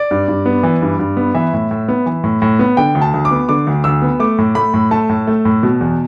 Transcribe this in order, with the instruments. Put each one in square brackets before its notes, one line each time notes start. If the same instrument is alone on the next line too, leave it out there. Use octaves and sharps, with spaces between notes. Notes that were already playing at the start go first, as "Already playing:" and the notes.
Already playing: [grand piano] D5
G2
G2
B3
E3
G2
G2
B3
E3 E5
A2
A2
B3
E3
A2
A2
B3
D3 G5
D2
A5
D2
D6
B3
D3 D6
D2
D2 E6
B3
A3 D6
A2
A3 B5
A2
A3 A5
A2
A3
A2
B2
E2